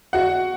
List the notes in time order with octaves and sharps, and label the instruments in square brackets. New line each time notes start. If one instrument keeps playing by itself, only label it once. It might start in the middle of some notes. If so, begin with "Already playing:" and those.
[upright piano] F#4 F#5